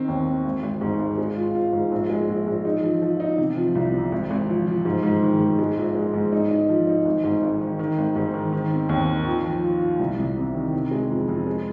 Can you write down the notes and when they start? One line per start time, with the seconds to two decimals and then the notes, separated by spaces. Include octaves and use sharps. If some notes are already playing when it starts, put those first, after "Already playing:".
Already playing: D#3 C4
0.08 D#2
0.26 C4
0.45 G#1
0.63 G#1
0.81 G#2
0.99 G#1
1.18 G#3
1.37 F4
1.55 F4
1.73 G#2
1.91 A#1
2.10 G#3
2.29 A#1
2.46 A#1
2.65 D#4
2.83 F3
3.02 F3
3.20 D#4
3.38 C3
3.57 F3
3.75 C2
3.94 C3
4.12 G#1
4.30 G#1
4.49 F3
4.67 F3
4.85 G#2
5.03 G#2
5.22 D#3
5.40 G#2
5.59 G#3
5.77 A#1
5.95 G#3
6.14 G#2
6.32 D#4
6.51 D#4
6.69 F3
6.87 D#4
7.05 G#1
7.24 G#2
7.42 G#1
7.61 D#3
7.79 D#3
7.98 G#1
8.16 G#2
8.34 D#3
8.53 D#3
8.71 C4
8.89 D#2
9.08 D#3
9.26 A#2
9.44 F3
9.63 F4
9.82 F4
9.99 C2
10.18 C2
10.36 C3
10.55 D#3
10.73 C3
10.91 G#3
11.10 F2
11.28 F2
11.47 G#3